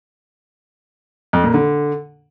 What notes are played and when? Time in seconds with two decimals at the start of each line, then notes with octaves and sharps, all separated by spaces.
1.33 F2
1.44 A#2
1.54 D3